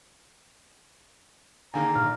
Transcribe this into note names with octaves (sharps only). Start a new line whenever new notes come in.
D3 D#3 A#3 G#4 F5 G#5 A#5
A#1 F6